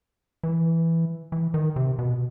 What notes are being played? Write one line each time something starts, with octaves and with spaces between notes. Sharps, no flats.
E3
E3
D#3
C3
B2